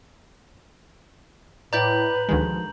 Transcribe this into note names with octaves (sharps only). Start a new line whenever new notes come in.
A2 E4 B4 D5 A#5 G6 F#7
D2 D#3 F3 G#3